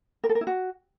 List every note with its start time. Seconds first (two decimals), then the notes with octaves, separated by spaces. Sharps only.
0.24 A#4
0.29 A4
0.35 A#4
0.41 E4
0.47 F#4